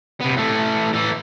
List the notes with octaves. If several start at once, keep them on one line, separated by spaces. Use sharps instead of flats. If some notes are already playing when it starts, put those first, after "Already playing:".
C3 B3
E3 A3
E3 A4